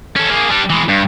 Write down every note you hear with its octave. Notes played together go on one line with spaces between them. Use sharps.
C#4 A4
A#3 G#4
G3 D4
E3 G#3
G2